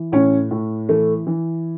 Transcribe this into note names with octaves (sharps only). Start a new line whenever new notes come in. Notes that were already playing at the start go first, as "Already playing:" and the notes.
Already playing: E3
A2 C#4
A2
E3 A3
E3